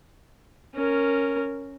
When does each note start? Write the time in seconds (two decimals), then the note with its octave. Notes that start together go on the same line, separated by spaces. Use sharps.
0.75 C#4 A#4